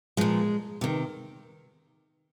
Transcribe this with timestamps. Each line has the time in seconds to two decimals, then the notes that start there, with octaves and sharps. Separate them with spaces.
0.17 A#2 F3 G#3
0.81 C3 D#3